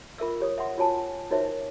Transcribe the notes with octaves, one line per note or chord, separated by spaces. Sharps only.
F4 A#4 E5 E6
G4 C#5 D#6
E5 F#5 C6
F4 F#4 C#5 G#5 A5
D#4 F#4 A#4 C5 C#5 E5